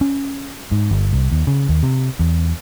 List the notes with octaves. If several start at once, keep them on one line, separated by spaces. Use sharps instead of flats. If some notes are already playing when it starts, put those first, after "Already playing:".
C#4
G#2
G1
C2
D#2
C#3
D#2
C3
E2